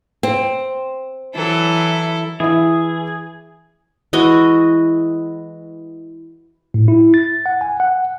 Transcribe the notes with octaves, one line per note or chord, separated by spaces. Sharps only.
C4
E3 F#3 E4 A4
E3 E4 G#4 E5
E3 G#3 F#4 D#5
A2
E4
A6
F#5
G#5
F#5